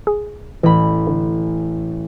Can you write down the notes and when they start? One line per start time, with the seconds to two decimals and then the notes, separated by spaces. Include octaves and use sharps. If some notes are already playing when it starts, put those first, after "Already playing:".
0.07 G#4
0.63 A1 E3 B5
1.07 D3